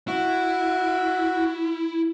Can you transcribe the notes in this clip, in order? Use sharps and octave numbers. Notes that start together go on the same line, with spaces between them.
E4 F#4